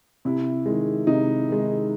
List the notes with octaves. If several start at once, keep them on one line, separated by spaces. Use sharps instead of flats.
C3 E4
D#3 G#3
C3 D#4
D#3 G#3